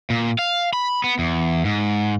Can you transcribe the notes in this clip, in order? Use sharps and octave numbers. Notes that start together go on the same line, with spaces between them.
A#2
F5
B5
B3
E2
G#2